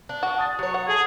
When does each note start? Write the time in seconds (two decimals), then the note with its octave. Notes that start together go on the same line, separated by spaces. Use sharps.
0.09 D4
0.23 F#4
0.36 A5 D#6 A6
0.59 F#3 C#5
0.74 F#5
0.88 G#4 A4 A5